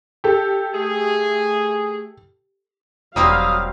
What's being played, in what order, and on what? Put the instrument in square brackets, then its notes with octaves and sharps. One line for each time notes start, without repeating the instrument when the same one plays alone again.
[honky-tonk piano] G4 A4
[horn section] A3 G#4
[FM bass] E1 [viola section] F#3 F5 [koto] G3 A#3 C4 [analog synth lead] D#6